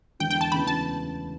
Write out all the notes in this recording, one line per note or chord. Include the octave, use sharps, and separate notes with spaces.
E1 E2 D3 G5
G5
A5
D2 C#3 E3 B3 E4 B5
A5